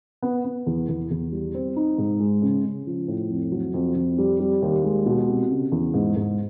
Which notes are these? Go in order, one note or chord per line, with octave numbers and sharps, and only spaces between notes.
B3
B3
E2
E2
E2
G3
C4
D#4
G#2
G#3
C#3
C#3
F3
A2
F2
F#3
F2
F2
G3
G3
D#2
G#3
B2
C2
C#3
E2
G#2
G#2